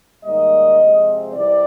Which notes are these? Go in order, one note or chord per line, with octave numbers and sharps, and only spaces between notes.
G#2 D#3 G3 A#3 D#5
C3 F3 G#3 C4
C3 E3 G3 D5